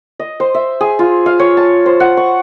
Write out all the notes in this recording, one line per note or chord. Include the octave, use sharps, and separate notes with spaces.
D#5
C5
E5
G#4
F4
F5
C#5
A5
C5
F#5
C#6